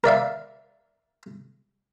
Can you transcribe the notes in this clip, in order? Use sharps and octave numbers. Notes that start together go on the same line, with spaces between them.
A#4 D5 E5 F5